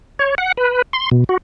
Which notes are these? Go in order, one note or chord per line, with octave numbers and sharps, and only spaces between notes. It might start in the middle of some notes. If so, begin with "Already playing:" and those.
C#5
F#5
B4
C6
B2
F#4